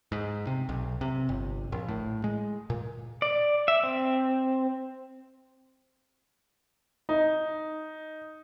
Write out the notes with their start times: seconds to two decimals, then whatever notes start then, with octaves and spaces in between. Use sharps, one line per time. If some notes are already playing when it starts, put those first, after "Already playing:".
0.12 G#2
0.47 C3
0.69 B1
1.01 C3
1.29 G1
1.72 A#1
1.88 A2
2.24 G#3
2.70 A#2
3.22 D5
3.68 E5
3.83 C4
7.09 D#4